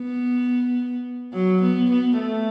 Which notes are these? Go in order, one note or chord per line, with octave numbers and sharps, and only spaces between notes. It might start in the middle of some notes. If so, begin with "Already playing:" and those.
Already playing: B3
F#3
B3
B3
A3